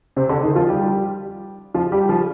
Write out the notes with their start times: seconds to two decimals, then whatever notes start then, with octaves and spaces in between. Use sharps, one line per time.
0.16 C3 C4
0.29 D3 D4
0.43 D#3 D#4
0.56 F3 F4
0.69 G3 G4
1.74 F3 F4
1.92 G3 G4
2.09 F3 F4